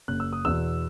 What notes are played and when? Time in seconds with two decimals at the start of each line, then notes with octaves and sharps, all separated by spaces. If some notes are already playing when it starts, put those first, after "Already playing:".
0.08 F#1 F#6
0.20 E6
0.33 D#6
0.45 E2 B2 E6